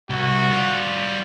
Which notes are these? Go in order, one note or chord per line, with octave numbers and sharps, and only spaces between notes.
C2 F#4
G3 F4